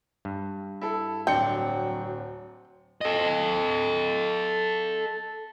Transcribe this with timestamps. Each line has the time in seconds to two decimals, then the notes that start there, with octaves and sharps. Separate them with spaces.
0.25 G2
0.81 E4 A4
1.27 D1 F#3 C4 D4 G5 C#7
3.01 A4 D#5